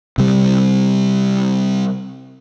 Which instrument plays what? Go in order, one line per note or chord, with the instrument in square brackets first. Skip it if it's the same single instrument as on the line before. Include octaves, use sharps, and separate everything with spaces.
[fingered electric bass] C3 G3